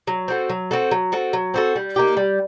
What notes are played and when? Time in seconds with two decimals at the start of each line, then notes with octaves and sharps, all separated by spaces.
0.07 F#3
0.28 C4 F#4 A4
0.50 F#3
0.71 C4 F#4 A4
0.91 F#3
1.12 C4 F#4 A4
1.33 F#3
1.54 C4 F#4 A4
1.76 G3
1.96 A#3 D#4 G4
2.17 G3